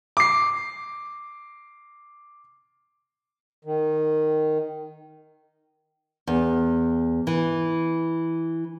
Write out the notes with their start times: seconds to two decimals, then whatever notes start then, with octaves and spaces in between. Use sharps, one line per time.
0.17 D6 C7
3.64 D#3
6.27 E2
7.27 E3